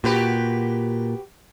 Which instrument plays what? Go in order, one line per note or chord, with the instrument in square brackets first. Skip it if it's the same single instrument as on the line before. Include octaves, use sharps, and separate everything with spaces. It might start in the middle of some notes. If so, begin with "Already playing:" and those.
[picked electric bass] A#2 [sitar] F#4 G4 B4